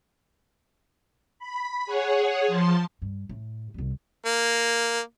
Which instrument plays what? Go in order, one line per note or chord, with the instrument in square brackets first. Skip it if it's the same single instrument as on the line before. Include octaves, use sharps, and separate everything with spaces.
[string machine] B5
G#4 C#5 F#5
F3 A5 C6
[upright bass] G2
A2
C2 G3
[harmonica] A#3